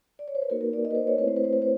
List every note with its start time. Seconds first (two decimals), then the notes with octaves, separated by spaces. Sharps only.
0.19 D5
0.28 C#5
0.35 C5
0.42 B4
0.50 A#3 D#4 F#4 A#4
0.61 A#4
0.73 D5
0.85 D#5
0.91 B4
0.95 C5
1.07 C#5
1.18 A3 C4 E4 B4
1.28 C5
1.36 B4
1.44 C5
1.53 B4
1.62 C5